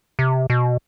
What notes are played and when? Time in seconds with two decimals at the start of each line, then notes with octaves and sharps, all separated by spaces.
0.19 C3
0.50 B2